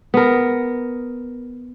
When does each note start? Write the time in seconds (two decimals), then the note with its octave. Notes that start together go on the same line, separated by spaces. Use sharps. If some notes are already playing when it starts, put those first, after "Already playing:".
0.14 B3 A#4